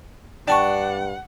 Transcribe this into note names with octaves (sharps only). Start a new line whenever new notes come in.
G2 D4 F#5 G5 A5 C#6